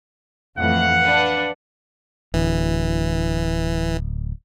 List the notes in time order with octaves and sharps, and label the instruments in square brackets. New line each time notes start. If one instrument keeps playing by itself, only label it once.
[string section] F2 A2 E3 [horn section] F5 F#5
[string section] D4 B4
[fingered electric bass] D1 [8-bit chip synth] E3